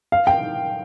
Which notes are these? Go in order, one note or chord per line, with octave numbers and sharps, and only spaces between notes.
F5
G5